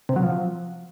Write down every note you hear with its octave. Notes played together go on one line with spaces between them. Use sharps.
C3
F#3
F3